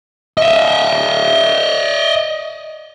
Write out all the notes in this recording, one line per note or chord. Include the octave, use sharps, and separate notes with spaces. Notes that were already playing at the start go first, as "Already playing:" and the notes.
D#5 E5